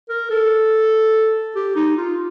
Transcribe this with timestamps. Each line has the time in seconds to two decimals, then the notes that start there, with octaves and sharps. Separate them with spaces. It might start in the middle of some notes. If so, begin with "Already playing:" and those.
0.09 A#4
0.30 A4
1.55 G4
1.76 D#4
1.97 F4